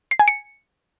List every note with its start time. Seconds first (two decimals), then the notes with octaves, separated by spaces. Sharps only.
0.11 C7
0.19 G#5
0.28 C#7